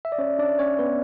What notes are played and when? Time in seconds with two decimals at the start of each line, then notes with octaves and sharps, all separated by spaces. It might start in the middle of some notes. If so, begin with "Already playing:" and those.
0.05 E5
0.12 D5
0.18 C#4 C#5
0.39 D4 D5
0.59 C#4 C#5
0.79 B3 B4